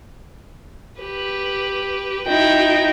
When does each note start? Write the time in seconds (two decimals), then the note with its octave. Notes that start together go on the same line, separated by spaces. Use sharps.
1.00 G4 B4
2.27 D#4 E4 F#4 G5